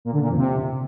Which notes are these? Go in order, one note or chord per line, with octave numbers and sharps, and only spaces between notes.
A#2
D3
A#2
F2
C3